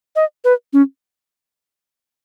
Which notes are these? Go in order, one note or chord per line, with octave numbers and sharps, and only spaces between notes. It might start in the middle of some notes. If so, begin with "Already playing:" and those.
D#5
B4
C#4